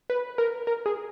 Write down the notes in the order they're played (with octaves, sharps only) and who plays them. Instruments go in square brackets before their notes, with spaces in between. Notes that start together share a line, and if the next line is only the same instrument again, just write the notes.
[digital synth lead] B4
A#4
A#4
G#4